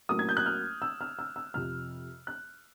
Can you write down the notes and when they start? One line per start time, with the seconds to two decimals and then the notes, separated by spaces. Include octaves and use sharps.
0.09 A2 F#3 A#3 C#4 D#6
0.19 G#6
0.29 G6
0.37 F#6
0.46 F6
0.82 E6
1.01 F6
1.19 E6
1.36 E6
1.54 F2 C3 F3 F6
2.27 F#6